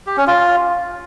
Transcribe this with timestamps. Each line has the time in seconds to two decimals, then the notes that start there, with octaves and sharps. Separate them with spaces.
0.07 G4
0.17 C#4
0.27 F4